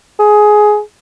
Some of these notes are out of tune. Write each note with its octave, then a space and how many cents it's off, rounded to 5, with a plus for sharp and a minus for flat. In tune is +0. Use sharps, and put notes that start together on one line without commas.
G#4 +15